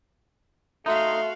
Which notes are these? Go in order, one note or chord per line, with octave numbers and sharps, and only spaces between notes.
A3 D#4 F#4 E5 F5 C6